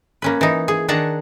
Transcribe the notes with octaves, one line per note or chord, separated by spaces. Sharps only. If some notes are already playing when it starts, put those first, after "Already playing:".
A#3 C#4 B4
E3 D#4
G#4
D#3 D4 G#4 F#5 A5 A#5